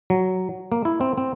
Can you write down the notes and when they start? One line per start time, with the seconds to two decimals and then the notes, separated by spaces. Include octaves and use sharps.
0.10 F#3
0.72 A#3
0.85 E4
1.01 C4
1.18 C4